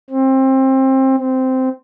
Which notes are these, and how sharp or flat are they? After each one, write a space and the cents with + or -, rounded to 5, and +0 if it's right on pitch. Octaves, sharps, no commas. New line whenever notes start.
C4 +25
C4 -10